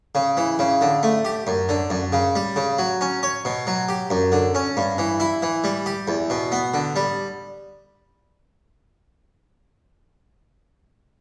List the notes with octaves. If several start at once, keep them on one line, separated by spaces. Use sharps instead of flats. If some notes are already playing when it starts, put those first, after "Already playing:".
C#3
E3
C#3
D3
A3
G4
F#2
D3
F#2
C#3
G3
C#3
F#3
C#4
C#5
B2
F#3
G4
F#2
D3
C#4
G2
E3
E4
E3
G3
G4
E2
B2
B3
D3
G3